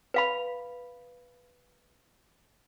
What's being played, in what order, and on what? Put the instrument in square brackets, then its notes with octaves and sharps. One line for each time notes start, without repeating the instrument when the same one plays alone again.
[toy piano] B4 F5 B5